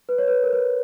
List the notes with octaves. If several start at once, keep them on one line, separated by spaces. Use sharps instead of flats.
B4
C#5
B4
A#4
B4